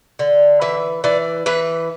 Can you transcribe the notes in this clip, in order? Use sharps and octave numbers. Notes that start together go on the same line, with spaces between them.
D3
E3 E5
E3 D5
E3 B4